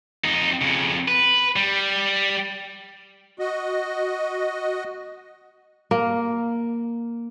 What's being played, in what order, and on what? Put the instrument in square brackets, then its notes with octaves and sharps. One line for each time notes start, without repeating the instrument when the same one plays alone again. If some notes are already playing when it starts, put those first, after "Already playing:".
[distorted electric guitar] F2 D#4
F2 C#3
B4
G3
[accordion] F#4 D#5
[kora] A#3